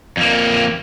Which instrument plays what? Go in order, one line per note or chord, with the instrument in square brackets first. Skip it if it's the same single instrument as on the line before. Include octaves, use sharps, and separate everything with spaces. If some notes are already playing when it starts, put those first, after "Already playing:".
[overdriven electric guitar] F2 A#3